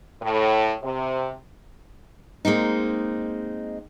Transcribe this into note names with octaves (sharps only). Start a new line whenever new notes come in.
A2
C3
G#3 A#3 C4 D#4